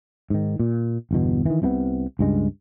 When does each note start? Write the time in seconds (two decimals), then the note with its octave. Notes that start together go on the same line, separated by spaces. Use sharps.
0.30 G#2 D#3
0.60 A#2
1.11 G1 E2 B2
1.46 D#3 E3
1.62 C2 C3 G#3 B3
2.19 C#2 G2 G#3